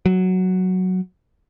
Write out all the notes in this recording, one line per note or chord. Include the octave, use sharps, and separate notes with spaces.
F#3